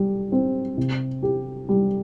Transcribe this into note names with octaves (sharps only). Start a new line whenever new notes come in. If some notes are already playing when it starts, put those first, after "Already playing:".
Already playing: G3
C4
C3
G4
G3